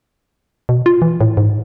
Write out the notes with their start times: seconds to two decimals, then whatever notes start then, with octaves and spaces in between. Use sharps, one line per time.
0.69 B2
0.86 F4
1.02 E3
1.21 A2
1.37 G#2